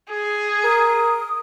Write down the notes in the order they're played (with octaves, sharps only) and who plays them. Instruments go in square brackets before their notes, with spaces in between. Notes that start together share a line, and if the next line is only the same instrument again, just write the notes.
[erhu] G#4
[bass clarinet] A#4 [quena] D#6